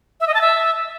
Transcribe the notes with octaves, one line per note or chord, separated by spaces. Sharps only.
E5
D#5
A5
E5